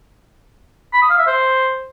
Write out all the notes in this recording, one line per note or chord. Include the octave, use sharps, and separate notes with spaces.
B5
D#6
F5
E5
C5